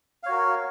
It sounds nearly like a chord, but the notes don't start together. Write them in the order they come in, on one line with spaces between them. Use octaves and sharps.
F5 C#5 F#4 A#4